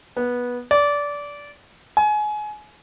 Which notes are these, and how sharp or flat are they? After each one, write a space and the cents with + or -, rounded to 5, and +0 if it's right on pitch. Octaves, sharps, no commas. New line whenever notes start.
B3 -15
D5 -20
G#5 +25